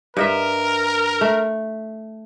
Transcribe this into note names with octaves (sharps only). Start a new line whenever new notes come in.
G2 A#4 D#5 E5
A3